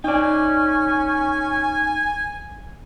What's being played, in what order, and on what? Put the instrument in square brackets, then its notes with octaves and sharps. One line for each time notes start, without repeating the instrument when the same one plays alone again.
[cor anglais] C#4 [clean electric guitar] D#4 D5 [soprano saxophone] G#5